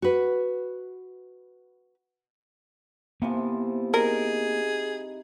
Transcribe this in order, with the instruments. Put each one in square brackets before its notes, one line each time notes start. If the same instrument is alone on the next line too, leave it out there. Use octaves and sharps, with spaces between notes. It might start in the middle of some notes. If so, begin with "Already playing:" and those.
[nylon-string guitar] F#4 B4
[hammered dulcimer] C3 E3 F3 [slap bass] A#3 B3
[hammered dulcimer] D#4 [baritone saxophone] G#4 [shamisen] A#4